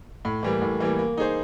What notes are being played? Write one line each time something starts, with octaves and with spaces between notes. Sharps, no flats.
A2
E3 G3 A#3
A2
E3 G3 A#3
A#3
D#4 G#4 C5